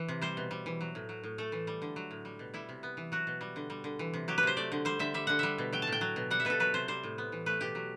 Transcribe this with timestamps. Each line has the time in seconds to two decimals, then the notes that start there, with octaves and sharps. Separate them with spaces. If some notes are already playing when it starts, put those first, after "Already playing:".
Already playing: E3
0.08 C3
0.21 G3 C5
0.37 B2
0.51 G3
0.66 E3
0.81 F#3
0.95 A2
1.09 F#3
1.23 A2
1.38 A3 A4
1.52 E3
1.67 G3
1.82 D3
1.96 F#3
2.11 A2
2.25 G3
2.39 B2
2.54 G3 E4
2.69 C3
2.83 B3
2.97 E3
3.12 F#3 F#4
3.27 B2
3.41 G3
3.56 D3
3.70 G3
3.84 D3
3.99 E3
4.14 C3
4.28 F#3 G4
4.38 B4
4.43 C3 C5
4.57 A3 D5
4.72 D3
4.85 G3 C5
4.99 D3 E5
5.14 G3 E5
5.27 D3 F#5
5.39 G3 E5
5.58 B2
5.73 F#3 G5
5.82 A5
5.87 A2
5.92 G5
6.01 F#3
6.16 B2
6.31 G3 F#5
6.40 E5
6.45 B2 A4 B4
6.60 F#3 B4
6.74 C3 C5
6.88 G3 C5
7.03 A2
7.18 B3
7.32 E3
7.46 A3 B4
7.61 B2 G4
7.75 F#3